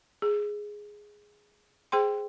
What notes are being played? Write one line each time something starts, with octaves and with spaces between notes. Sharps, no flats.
G#4
G#4 C5 G5 C6